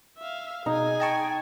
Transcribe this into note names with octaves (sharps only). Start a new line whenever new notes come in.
E5 F5
B2 D#4 G#4 G#5
D#5 G5 A5 C#6